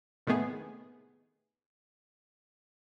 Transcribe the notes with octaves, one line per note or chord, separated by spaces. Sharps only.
A2 C3 D#3 A3 B3 G#4